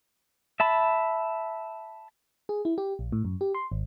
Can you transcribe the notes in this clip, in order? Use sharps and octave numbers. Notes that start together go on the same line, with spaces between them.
E5 A5 B5
G#4
E4
G4
A#1
A2
F#2
G4
C6
G#1